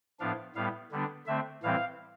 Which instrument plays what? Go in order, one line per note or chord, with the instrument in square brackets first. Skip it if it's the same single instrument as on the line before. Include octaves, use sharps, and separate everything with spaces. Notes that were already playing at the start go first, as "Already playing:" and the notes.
[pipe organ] A2 F3 B3 D4 F5
A2 G3 B3 F5
D3 G3 B3 D4
D3 A3 C4 E5
A2 E3 G3 C4 F5